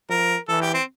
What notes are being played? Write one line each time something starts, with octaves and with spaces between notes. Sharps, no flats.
F3 A#4
E3 A4
G4
C4